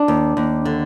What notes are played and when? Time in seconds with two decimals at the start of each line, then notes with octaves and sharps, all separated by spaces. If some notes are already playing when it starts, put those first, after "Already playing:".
Already playing: D4
0.08 D#2
0.37 D#2
0.65 D3